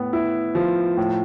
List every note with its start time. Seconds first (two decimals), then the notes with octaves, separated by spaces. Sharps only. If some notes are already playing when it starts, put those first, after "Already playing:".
Already playing: A2 B3
0.13 E4
0.55 F3
0.97 A2